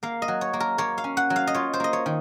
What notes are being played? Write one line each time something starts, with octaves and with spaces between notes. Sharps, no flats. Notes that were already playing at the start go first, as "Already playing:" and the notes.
A#3 F5
D#5
F#3
C#5
A#3
A#4
A#3 C#5
F5
C#4
F#5
F#3
F5
D#5
F4 C#5
C5
A#3 D#5
C#5
D#3